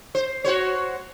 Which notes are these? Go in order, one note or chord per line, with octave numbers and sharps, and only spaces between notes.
C5
F#4 C5 C#5